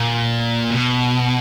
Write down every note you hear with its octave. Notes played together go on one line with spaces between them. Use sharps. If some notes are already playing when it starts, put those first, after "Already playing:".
Already playing: A#2
B2